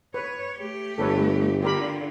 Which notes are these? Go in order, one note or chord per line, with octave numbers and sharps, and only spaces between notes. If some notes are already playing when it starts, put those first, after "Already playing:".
B4 C#5
A3 G4
G1 A4 B4 C#5
D3 F4 G4 A#4 B5